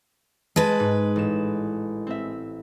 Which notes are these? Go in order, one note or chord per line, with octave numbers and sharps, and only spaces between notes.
G#3 B4 D#5 A5
G#2
A1 E7
C4 E5